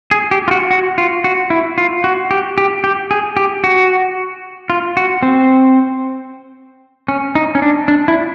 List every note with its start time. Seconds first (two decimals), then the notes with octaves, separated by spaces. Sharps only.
0.11 G#4
0.31 G4
0.48 F4
0.51 F#4
0.71 F#4
0.98 F4
1.24 F#4
1.50 E4
1.78 F4
2.04 F#4
2.31 G4
2.58 G4
2.84 G4
3.11 G#4
3.37 G4
3.64 F#4
4.70 F4
4.97 F#4
5.23 C4
7.08 C#4
7.35 D#4
7.55 C#4
7.62 D4
7.88 D4
8.08 E4